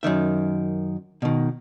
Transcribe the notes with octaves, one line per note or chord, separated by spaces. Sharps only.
F#2 C3 D#3 E5
B2 D#3